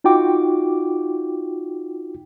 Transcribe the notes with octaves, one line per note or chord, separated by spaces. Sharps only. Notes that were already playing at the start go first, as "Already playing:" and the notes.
D#4 F4 F#4 G5 D6